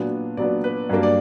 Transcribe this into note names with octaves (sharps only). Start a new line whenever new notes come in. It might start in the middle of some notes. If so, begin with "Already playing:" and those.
Already playing: A#2 F#3 B3 D4
A#2 F#3 B3 D4 D5
B4
G2 F#3 A#3 D4
D5